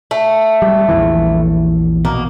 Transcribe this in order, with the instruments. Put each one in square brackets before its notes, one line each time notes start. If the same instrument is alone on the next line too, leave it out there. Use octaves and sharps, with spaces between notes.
[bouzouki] A3
[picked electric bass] G3
A#1 E2 E3
[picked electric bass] B2 [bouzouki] A#3